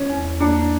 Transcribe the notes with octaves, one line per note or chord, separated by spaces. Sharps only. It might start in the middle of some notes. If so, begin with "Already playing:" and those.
Already playing: C#4
E2
A#3 D4